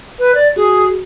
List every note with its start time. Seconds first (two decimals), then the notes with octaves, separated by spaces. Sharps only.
0.19 B4
0.35 D5
0.56 F#4 G#4